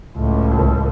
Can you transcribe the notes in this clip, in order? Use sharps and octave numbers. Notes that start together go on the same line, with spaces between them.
C#2 A2